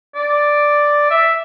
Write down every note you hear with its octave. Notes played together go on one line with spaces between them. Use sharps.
D5
E5